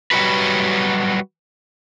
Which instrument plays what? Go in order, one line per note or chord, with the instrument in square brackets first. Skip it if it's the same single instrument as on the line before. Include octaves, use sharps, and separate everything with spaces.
[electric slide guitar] F#3 G3 D#4 F#4 B4